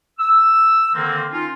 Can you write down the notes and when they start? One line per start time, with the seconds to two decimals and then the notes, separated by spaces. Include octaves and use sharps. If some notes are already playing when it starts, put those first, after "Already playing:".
0.19 E6
0.94 D3 D#3 A#3 C4
1.31 C#4 D#4 F4